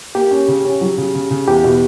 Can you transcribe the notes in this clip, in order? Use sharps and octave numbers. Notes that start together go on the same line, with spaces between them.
A#3 G4
C#4
C#3
C#4
F#3
C#3
C#3
C#3
E2 G4
B2